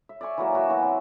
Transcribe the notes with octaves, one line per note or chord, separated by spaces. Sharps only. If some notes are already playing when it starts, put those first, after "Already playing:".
E5
D5 E5 G#5 C#6
E3 F#3 A#3 A#4
F#4 D5 E5 G#5
E3 F#3 B3
C4